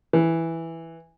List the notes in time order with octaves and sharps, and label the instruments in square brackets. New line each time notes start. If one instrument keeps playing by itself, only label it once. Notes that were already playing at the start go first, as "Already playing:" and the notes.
[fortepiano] E3